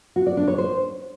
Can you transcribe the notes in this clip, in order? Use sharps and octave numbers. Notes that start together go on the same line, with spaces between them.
F#4
D5
D4
C#5
C5